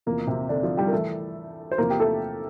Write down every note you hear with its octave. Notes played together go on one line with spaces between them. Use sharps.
E2 C3 F3 A#3
C3 C4
D3 D4
F3 F4
G3 G4
A#4
A2 E3 A3 A4
C5
E2 C3 F3 A#3 A#4
G4
A3 A4